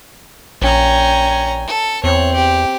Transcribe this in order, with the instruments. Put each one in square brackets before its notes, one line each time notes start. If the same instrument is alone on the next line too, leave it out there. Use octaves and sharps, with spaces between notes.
[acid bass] A#1 [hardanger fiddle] C#4 A#5 [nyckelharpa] G5 G#5
[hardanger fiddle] A4
[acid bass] E2 [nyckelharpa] C4 [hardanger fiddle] C#5
[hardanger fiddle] G4